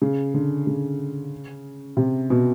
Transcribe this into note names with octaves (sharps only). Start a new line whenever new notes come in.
C#3
D3
C#3
C3
B2